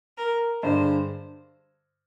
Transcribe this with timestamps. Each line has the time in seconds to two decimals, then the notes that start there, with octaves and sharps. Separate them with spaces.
0.18 A#4
0.63 G2 D3 G#3 C5